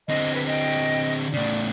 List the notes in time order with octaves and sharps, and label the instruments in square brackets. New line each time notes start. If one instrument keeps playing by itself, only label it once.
[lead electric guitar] D3 C4 [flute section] D#5
[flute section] B4
D#5 G5
[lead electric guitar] A2 C#3 [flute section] D5